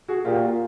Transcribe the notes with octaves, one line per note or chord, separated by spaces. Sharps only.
F#4 G#4
A#2 F4 G4